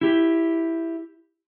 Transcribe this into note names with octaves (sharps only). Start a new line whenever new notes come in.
E4 G4